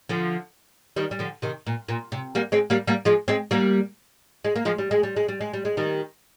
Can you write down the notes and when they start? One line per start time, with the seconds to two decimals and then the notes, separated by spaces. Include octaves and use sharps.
0.09 D3 F3
0.96 D#3 G3
1.11 G3
1.19 D3 F3
1.42 C3 D#3
1.66 A#2
1.88 A#2
2.12 C3
2.35 G3 A#3
2.52 G#3 C4
2.70 G3 A#3
2.87 G3 A#3
3.05 F3 G#3
3.28 G#3 C4
3.51 G3 A#3
4.44 G#3
4.56 A#3
4.65 F3 G#3
4.78 G3
4.91 G#3
5.03 G3
5.16 G#3
5.28 G3
5.41 G#3
5.54 G3
5.65 G#3
5.77 D#3 G3